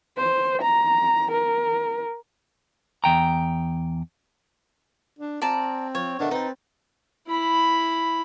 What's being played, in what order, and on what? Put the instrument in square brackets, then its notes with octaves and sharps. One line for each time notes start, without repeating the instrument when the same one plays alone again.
[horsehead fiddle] C5
A#5
A#4
[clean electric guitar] E2 G5 A#5
[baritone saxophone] D4
[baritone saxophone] C4 [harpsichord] F4 [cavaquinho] D5 A5 A#5
[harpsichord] F3 [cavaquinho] C#5
[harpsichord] B2 D#3 A3 [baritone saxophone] D4
[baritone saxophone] C4 [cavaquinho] D#4 [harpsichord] B4 A5
[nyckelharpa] E4 B5